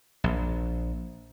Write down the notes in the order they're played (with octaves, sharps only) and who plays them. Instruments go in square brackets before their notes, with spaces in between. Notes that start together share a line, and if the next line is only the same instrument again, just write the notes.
[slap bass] A#1